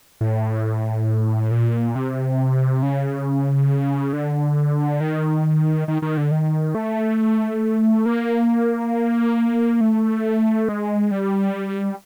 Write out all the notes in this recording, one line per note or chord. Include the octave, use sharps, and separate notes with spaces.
A2
A#2
C3
C#3
D3
D#3
D#3
D#3
D3
D#3
A3
A#3
A3
G#3
G3